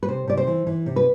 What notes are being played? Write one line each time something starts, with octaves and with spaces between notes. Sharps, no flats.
B4
C3 C5
C3 D5
C5
E3
E3
C3
B4